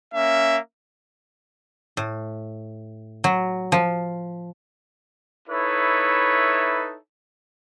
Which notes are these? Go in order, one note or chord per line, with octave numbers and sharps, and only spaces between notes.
A#3 C#4 E5
A2
F#3
F3
D#4 E4 A4 B4 C#5 E5